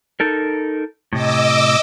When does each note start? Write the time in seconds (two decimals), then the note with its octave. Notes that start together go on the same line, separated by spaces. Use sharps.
0.20 D#4 A4 A#4
1.13 A2 C3 D#5 D6 E6